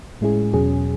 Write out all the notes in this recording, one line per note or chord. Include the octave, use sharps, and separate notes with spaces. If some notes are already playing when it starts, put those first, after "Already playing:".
A2 G#3 C#4 E4 G#4
E2 B2 F#3 C#4 G#4